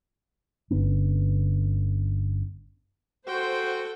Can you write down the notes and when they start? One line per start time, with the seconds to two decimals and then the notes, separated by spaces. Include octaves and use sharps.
0.71 G1 D3 B3 C#4
3.27 F#4 A4 C5 G5